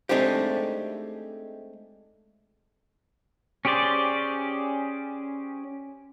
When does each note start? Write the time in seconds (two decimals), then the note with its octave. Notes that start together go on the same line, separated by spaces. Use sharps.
0.09 G#3 A3 C4 D4 D#4 G4
3.65 C#4 G4 G#4 C5 D5